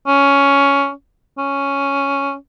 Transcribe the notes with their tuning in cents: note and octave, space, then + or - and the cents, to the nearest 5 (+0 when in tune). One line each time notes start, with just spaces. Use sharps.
C#4 +10
C#4 +5